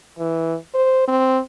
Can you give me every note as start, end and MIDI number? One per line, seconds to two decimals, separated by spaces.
0.19 0.55 52
0.74 1.05 72
1.08 1.39 60